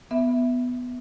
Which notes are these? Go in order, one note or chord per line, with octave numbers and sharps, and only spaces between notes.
B3 E5